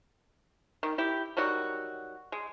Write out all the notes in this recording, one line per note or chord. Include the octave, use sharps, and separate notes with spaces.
D#3
E4 G4
D#3 F#3 G3 F#4
G#3